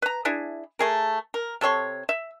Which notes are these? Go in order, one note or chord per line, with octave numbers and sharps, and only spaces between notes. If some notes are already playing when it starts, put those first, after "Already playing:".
B4 A#5
D4 E4 G#4
A3 G#4 A#4
A#4
C3 A4 C#5 C6
E5